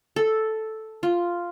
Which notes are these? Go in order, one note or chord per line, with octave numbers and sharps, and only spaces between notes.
A4
F4